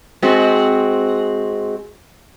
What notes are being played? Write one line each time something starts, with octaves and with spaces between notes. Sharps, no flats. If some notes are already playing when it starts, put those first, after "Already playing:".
G#3 C4 F#4